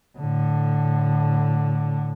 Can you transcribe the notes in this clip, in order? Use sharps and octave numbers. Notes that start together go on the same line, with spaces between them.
A2 D3